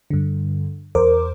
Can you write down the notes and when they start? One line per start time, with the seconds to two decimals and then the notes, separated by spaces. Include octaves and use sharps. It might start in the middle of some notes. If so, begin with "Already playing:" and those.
0.10 G2 D3
0.95 E2 A#4 C5 D6